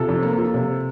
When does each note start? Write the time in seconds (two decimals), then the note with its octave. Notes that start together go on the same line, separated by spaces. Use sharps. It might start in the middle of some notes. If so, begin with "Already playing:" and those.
Already playing: C3 F4 A4
0.08 F2
0.23 A#3
0.38 F3
0.54 C3